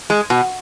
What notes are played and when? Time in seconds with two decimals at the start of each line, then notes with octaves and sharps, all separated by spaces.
0.10 G#3
0.30 B2